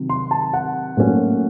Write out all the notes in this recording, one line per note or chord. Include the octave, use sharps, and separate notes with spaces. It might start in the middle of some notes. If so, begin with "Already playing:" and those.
Already playing: C3 D#3 F#3
C6
A5
F#5
A2 F#3 A#3 C#4